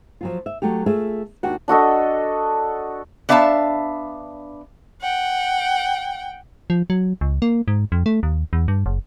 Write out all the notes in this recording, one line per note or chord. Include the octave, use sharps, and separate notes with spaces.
F3 F#3 F4
E5
F#3 A3 F#4 G4
A3 F4 G#4 E5
D#2 D4 F#4 G4 F#5
D4 F#4 A4 D#5
B3 D4 E5 F5 G5 A5
F#5 G5
F3
F#3
C#2
A#3
G#2
F2
A3
D#2
E2
G2
F#1